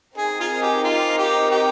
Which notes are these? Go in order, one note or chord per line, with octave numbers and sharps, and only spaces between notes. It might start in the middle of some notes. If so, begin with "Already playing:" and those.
C4 D#4 G#4 A#4
F4 G#4
G4
F4
G4
G4